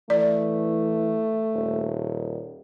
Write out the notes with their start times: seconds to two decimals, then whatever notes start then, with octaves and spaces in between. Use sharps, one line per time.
0.10 E3 A3 D5
1.54 D#1